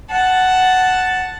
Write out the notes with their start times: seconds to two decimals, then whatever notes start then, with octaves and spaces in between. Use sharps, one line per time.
0.11 F#5 A5